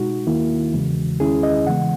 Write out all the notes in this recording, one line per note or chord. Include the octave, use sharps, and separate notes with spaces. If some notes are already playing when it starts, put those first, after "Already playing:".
Already playing: B2 G#3 D#4 F#4
D#2 D#3 A#3 E4
E2 C#3 E3 G#3
E2 D#3 G#3 C#4 E4 G#4
D#5
C#3 E3 G#3 B3 F#5